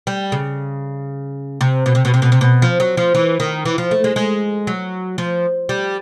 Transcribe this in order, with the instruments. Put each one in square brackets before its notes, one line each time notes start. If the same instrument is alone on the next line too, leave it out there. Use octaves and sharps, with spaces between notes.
[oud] G3
C#3
C3
B2
C3
B2
C3
B2
C3
B2
F3
F#3
F3
E3
D#3
E3
F3
A3
G#3
G#3
F#3
F3
G3